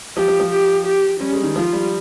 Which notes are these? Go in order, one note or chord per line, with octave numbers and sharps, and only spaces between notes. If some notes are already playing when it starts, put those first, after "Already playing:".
F3 G4
F3
F3
G4
G4
G3 C#4
G#3
D#3
F3 F4
G3